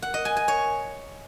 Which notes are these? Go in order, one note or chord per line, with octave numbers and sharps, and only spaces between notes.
F#5
D#5
G#5
G#5
C#5